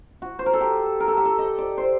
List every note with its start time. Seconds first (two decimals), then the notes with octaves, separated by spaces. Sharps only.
0.22 F#4
0.39 C5
0.46 A#4
0.53 A4
0.61 G4
1.00 A#4
1.08 A4
1.17 G4
1.25 A4
1.39 D#5
1.58 D5
1.78 C5